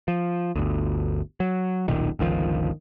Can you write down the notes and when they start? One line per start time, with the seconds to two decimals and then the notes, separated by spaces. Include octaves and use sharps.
0.08 F3
0.56 G1 D2
1.40 F#3
1.88 D#1 B1 A#2 D#3
2.19 G1 C#2 D#3 F3